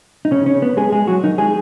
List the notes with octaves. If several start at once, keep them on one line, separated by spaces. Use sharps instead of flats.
D#4
C#3 C#4
C#3 C#4
B3
G#3 G#4
G#3 G#4
F#3 F#4
D#3 D#4
G#3 G#4